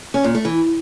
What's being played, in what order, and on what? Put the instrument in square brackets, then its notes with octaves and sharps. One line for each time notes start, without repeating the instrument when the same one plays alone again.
[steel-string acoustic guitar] C#4
A#2
A3
E3